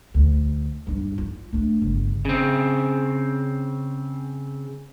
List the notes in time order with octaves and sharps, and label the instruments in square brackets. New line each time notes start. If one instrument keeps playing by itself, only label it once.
[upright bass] D2
G2 D4
F4
A3 D4
G1 C#3
[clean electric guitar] C#3 C4